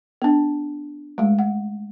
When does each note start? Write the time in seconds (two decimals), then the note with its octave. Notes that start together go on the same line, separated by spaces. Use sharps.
0.22 B3 D4
1.18 G#3 A3
1.39 F#5